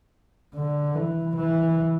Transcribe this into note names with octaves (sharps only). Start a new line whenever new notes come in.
D3
E3
E3